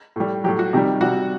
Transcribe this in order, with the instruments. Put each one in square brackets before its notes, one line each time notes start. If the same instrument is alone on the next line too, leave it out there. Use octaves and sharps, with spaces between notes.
[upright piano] A2 G3
F#3 G4
A2
F#4
C3 D#3 G3 G4
C3 G3 F#4